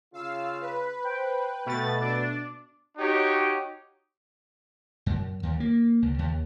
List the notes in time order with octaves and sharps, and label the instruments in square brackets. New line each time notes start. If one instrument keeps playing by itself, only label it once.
[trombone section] C#3 F4 [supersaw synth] F5 E6
[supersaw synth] B4
[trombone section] C5 [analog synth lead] G5
[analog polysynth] B2 A6 [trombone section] A3
[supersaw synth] D4 [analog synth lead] D6
[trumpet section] D#4 F#4 G4 C#5
[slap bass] F#2
D#2
A#3
C#2
D#2